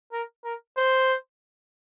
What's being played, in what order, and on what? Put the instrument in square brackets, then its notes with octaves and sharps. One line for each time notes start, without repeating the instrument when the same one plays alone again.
[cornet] A#4
A#4
C5